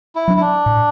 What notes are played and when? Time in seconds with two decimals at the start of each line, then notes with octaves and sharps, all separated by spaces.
0.15 E4
0.28 F#3 D4
0.37 E4
0.41 D4
0.66 A2